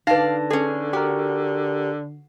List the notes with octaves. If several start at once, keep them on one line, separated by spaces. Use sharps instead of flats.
D3 D#4 B4 D5 F5 A5 A#6
C#4 G#4 A4
F#4 G4 A#4